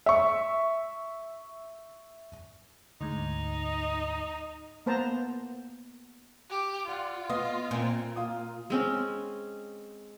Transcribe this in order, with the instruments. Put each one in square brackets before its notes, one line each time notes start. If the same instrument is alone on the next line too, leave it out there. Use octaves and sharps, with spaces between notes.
[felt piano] E5 C#6
[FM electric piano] D2 G#2 [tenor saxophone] D#4
[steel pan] A#3 B3 C5 A5 A#5
[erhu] G4
[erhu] F4 [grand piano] D5 F#5
[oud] B3 [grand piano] D#5 F5 D#6
[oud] A#2 [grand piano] C4 G#5
[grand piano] F4 D#6
[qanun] G#3 C4 C#4